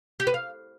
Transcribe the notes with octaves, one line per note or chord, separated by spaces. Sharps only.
G4
B4
F5